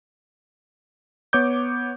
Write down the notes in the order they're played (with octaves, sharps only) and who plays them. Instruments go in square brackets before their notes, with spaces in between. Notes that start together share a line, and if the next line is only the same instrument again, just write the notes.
[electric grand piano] B3 C#5 D6 G6